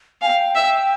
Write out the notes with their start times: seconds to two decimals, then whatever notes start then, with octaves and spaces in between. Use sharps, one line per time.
0.21 F5 G#5
0.26 G5
0.55 E5